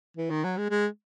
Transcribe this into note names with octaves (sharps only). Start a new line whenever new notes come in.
E3
D#3
F#3
G#3
G#3